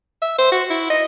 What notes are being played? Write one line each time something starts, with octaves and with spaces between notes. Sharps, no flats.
E5
C5
F#4
E4
D#5